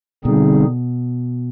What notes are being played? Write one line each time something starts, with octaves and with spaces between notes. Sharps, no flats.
B2 D3 G3 C4 D#4 G#4